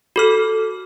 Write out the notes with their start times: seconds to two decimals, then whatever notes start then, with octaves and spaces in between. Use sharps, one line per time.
0.16 F#4 A4 F6